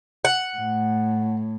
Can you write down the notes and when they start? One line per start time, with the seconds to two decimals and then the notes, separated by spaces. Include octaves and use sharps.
0.25 F#5
0.57 A2